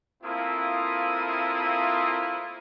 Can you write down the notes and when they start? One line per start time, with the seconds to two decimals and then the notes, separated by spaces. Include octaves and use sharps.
0.23 A3 A#3 C4 E4 F4 D#6